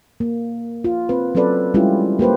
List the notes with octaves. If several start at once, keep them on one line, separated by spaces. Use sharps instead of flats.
A#3
F4
C4 B4
F#3 C4 C#4 A4 B4 D5
G3 G#3 C#4 E4 F4 G4
A#3 G4 B4 C5